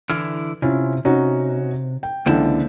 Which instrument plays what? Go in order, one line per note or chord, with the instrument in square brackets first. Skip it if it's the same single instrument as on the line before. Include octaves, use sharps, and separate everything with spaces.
[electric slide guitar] D3 E3 E4 [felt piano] F6
[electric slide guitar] C3 [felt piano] C#4 E4 F4
[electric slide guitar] C3 [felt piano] C#4 D#4 F#4
[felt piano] G5
[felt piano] C#2 D3 E3 [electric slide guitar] A#3 C5 A5